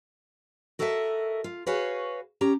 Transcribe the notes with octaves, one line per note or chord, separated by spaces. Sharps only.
F#4 A4 A#4 C5 D#5 E5
F4
F#4 G#4 B4 C#5 F5 G#5
C#4 G4 A#5